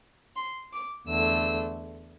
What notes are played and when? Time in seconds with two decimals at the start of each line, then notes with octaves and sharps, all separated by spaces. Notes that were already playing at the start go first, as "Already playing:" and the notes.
0.36 C6
0.72 D6
1.07 E2 D3 A3 E6